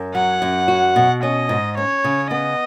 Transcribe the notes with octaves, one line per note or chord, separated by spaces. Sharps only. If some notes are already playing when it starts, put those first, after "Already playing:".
Already playing: F#2
F#3 F#5
F#2
F#4
B2
C#4 D#5
G#2
C#4 C#5
C#3
B3 D#5